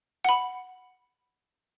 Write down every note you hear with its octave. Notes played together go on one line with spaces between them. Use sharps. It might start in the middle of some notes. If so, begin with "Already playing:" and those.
F#5 B5